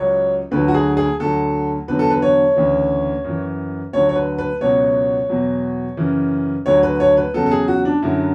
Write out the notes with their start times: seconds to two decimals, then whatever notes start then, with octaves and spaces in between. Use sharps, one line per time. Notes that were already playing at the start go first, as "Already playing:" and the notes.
Already playing: C#2 C#3 F#3 C#5
0.51 D2 D3 F#3 B4
0.68 F#4
0.74 G#4
0.97 G#4
1.20 D2 D3 F#3 A4
1.88 E2 D3 F#3 B4
1.99 A4
2.10 B4
2.22 C#5
2.56 D2 C#3 E3
3.24 F#2 E3
3.93 D2 D3 F#3 C#5
4.09 C#5
4.16 B4
4.38 B4
4.61 C#2 B2 F#3 C#5
5.29 E2 B2 F#3
5.97 F#2 C#3 E3
6.66 D2 D3 F#3 C#5
6.83 B4
7.00 C#5
7.17 B4
7.34 E2 C#3 F#3 A4
7.46 A4
7.51 G#4
7.68 F#4
7.85 D4
8.02 F#2 D3 F#3 E4